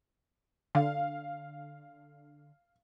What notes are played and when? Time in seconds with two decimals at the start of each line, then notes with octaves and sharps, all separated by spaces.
0.75 D3 F5